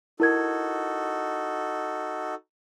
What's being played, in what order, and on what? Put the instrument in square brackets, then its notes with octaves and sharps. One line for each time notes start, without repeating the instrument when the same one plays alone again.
[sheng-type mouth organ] D#4 F#4 A4 [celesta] E4 A#4 G#6